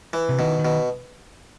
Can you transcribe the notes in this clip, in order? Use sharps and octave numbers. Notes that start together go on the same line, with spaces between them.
E3
C3
B2 D#3
D#3
B2